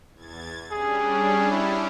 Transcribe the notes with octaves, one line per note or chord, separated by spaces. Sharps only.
E2 G#6 A6
G3 C#4 D4 G#4
E4